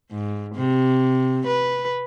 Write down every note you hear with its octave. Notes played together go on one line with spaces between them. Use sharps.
G#2
C3
B4